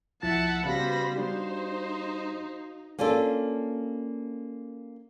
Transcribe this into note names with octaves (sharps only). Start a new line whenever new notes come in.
C2 F3 E4 E5 F#5 A5 A6
C#3 G3 B3 F#4 C5 F5 B5 A#6
G3 D4 D#4 G4 C5
A#3 C#4 D4 F4 A4